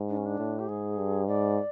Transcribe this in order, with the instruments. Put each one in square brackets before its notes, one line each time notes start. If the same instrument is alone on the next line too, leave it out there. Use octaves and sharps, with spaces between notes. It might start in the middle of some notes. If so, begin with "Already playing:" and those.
Already playing: [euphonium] G#2
[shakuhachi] D4
C#4
D4
[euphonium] A2
[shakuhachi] G4
[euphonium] G#2 [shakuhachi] G#4
[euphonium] G2
[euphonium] G#2 [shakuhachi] D5